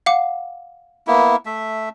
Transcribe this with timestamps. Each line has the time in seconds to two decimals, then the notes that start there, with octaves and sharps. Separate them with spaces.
0.06 F5 F#5 D6
1.07 A#3 B3 E4
1.46 A3 E5